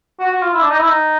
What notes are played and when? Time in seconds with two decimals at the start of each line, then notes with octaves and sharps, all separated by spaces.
0.20 F#4
0.31 F#4
0.42 F4
0.54 E4
0.62 D4
0.70 D#4
0.79 E4
0.88 D#4